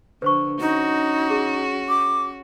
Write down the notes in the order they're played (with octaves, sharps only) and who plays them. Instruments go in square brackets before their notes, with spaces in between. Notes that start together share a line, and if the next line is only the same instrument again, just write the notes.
[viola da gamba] D3 [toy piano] B4 C5 C#6
[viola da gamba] C#4 F#4 [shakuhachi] D#4
[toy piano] G#4
[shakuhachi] D6